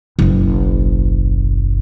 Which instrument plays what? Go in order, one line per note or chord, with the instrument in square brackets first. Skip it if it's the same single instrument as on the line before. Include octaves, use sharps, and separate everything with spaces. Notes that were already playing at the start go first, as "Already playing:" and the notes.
[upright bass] F#1 B1